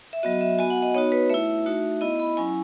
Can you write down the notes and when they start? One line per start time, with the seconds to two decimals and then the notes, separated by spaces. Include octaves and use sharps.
0.13 E5
0.23 F#3 B3 F#4 D#5
0.41 E5
0.58 B3 F#4 G#5
0.70 F#5
0.83 D#5
0.94 B3 D#4 F#4 C#5
1.12 B4
1.29 A3 E4 E5
1.66 A3 D#4 F#4
2.01 B3 E4 D#5
2.20 B5
2.37 F#3 C#4 E4 G#5